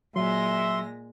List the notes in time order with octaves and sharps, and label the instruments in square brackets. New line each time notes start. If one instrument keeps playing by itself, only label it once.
[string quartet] A#2 G#3 A#6 [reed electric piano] F#3 [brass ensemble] E5 [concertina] C6